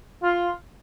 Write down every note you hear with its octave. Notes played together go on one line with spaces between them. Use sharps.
F4